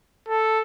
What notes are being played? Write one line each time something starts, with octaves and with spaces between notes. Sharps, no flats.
A4